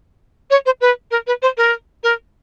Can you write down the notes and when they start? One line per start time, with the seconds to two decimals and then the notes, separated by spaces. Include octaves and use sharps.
0.51 C#5
0.66 C5
0.81 B4
1.11 A#4
1.27 B4
1.42 C5
1.57 A#4
2.03 A#4